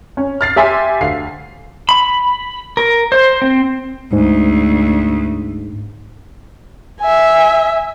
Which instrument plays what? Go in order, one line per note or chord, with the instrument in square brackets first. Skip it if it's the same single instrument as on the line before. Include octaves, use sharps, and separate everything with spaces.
[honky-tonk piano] C#4
F6 A6 C7
G4 E5 G#5 C6
D2 F5 C7
[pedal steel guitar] B5
A#4
C5
C4
[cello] D2 [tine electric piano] G#2
[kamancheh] E5 G#5